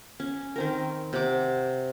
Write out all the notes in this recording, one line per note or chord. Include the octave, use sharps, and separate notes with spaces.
C#4
D#3 C4 A#4
C3 F#5 D6